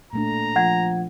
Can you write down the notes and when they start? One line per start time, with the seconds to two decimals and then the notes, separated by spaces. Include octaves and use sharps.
0.13 A#2 A3 D4 A#5
0.56 F3 F#5 G#6